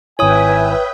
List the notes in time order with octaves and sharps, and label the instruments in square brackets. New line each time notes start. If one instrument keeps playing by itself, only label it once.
[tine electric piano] G#1 E4 [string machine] B4 E5 G5 [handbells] C#5 D#6 [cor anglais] G#5